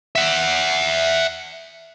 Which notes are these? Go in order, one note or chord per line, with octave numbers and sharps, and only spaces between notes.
E5 F#5